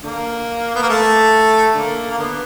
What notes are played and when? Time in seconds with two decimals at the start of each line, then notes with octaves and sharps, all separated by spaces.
0.03 D3 A#3
0.75 B3
0.82 A#3
0.89 A3
1.75 D3 A#3
2.11 A#3
2.18 D3 B3